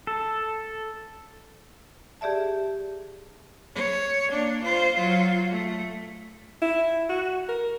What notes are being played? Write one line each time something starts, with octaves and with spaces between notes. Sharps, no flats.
A4
G4 G#4 D5 E5 A5
C#5
A#3 D4
F4 C5
F#3 F4
A3
E4
F#4
A#4